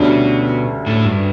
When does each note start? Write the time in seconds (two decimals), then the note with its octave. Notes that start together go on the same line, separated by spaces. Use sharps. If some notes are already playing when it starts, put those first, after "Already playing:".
Already playing: D2 B2 D3 G3 C#4
0.87 A2
1.05 G2